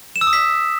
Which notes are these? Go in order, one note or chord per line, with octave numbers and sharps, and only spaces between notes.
E7
E6
D#6
B6